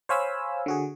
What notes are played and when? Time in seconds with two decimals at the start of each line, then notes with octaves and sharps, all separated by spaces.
0.09 C5 C#5 F5 G#5 B5 E6
0.66 D3 F#4 G#4